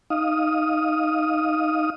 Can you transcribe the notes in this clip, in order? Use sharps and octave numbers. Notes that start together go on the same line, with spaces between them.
D#4 F5 D#6